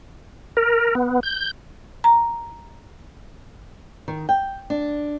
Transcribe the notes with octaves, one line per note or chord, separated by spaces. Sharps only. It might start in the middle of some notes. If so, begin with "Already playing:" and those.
A#4
B3
G6
A#5
D#3
G5
D4